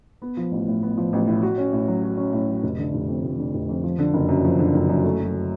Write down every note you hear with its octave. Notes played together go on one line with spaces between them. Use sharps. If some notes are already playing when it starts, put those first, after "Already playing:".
B3
F3
A1
A2
B3
F3
A1
A2
F#4
C#4
A2
F#3
F#4
C#4
A2
F#3
F1
D3
F1
F2
F1
D3
F1
F2
F3
D3
F#1
F#2
F3
D3
F#1
F#2
A3
F#3